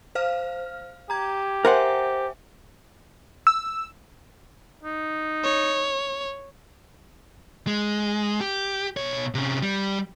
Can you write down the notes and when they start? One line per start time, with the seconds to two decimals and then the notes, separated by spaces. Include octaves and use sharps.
0.15 C5 F5 F6
1.10 G4 A#5 G#6
1.65 A#4 C5 E5 F#5 G#5
3.47 E6
4.83 D#4
5.43 C#5
7.67 G#3
8.41 G4
8.97 B2 C#5
9.35 C3 C#4
9.63 G3